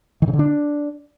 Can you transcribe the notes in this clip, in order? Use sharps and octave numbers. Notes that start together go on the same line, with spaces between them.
D#3
C#3
D3
D4